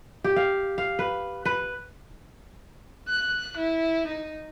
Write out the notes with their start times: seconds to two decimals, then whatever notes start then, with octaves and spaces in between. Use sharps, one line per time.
0.24 G4
0.36 F5
0.78 F5
0.99 B4
1.45 B4
3.08 F#6
3.57 E4
4.07 D#4